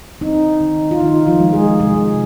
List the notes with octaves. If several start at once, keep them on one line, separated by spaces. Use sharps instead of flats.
C4 D#4
D#3
F4
D#3 D#4
F3 F4
G#3
G#3 G#4
C3 G#3 G#4